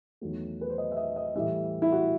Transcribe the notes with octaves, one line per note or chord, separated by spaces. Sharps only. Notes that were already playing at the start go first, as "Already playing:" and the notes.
E2 D#3 F#3 A3
B4
C5
D#5
E5
D#5
D#5
A2 E3 G3 E5
E4
F#4